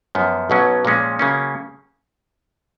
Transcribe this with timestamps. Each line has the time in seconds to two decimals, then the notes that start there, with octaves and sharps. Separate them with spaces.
0.15 F#2 F3 B3
0.50 B1 B2 F#3 C#4
0.85 A#2 F3 G#3 C#4
1.19 C#3 F#3 A#3 C#4